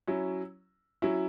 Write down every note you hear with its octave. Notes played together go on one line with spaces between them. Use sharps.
F#3 C#4 E4
F#3 C#4 E4